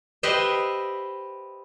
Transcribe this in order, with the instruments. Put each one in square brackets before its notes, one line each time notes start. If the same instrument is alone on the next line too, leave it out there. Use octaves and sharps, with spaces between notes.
[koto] G4 B4 C5 D#5 E5